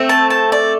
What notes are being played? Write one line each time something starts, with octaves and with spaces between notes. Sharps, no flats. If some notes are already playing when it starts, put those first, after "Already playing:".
Already playing: A3 C4
A5
A5
D5